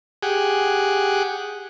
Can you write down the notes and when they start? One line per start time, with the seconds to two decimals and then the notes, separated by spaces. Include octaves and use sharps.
0.23 G4 G#4 F#5